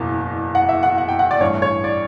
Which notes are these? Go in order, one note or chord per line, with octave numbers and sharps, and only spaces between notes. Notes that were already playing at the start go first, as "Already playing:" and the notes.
Already playing: F#1 E2 B2
F#5
E5
F#5
F#5
G5
F#5
D5
A1 G2 E3 C#5
C#5
D5